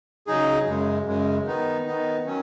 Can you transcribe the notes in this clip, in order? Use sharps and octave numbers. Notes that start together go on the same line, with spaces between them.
C#3 F#3 D#4 G#4
F#2 C#3 G#3
F#2 C#3 G#3
D#3 B3 D#4
D#3 B3 D#4
D#3 F#3 C#4